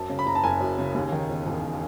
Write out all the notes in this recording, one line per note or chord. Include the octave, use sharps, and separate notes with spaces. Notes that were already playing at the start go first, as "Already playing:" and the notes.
Already playing: F#2 A5
C#3
B5
F#1 A#5
A5
F#1 G#5
F#2
C#3
D#2
D#3
E1
E1